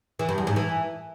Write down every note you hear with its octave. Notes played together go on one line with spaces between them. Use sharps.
E3
G2
E2
G#2
E3